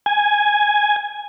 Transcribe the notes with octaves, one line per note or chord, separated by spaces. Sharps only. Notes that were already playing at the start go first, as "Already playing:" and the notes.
G#5